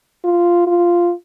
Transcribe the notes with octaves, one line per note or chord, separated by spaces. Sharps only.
F4
F4